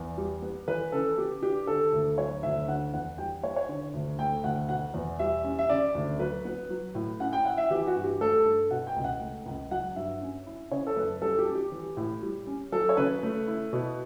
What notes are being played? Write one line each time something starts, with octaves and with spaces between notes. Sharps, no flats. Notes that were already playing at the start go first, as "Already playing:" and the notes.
Already playing: E2
G3
B3
E3 B4
C#3 A4
B3 G4
D4 G4
D3 A4
D2
F#3 C#5
D2 E5
D3 F#5
E2 F#5
G3 G5
B3 C#5
C#5
D3
D2
A3 G5
D2 F#5
B2 F#5
E2
G3 E5
C#4
E5
C#3 D5
D2
F#3 B4
B3
F#3
A2
C#4 F#5
G5
E4 F#5
E5
E3 G4
F#4
G2
G4
A3 A4
G2
B2 F#5
G5
C#2
F#5
A3
C#2
F#3 F#5
G2 E5
C#4
E4
C#3 C#5
A4
F#2 B4
G3 A4
G4
C#4
G4
E3
A2
G3
C#4
F#3 A4
C#5
C#3 B4
A3
E4
B2